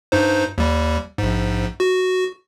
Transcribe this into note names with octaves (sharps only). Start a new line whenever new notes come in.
G2 D#4 C5
D#2 G3
A#1 G#2
F#4